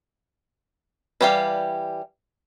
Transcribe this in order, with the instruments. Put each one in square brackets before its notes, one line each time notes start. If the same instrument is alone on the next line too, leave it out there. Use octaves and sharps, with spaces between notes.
[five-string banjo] E3 G3 G4 D5 F5